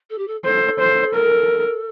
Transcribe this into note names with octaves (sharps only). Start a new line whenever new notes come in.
A4
G4
A4
A4 C5
C5
A#4